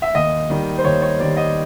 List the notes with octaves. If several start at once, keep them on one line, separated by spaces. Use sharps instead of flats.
E5
D#2 D#5
D#3 G3
C5
D#2 C#5
C#5
D#3 G3 D5
D#5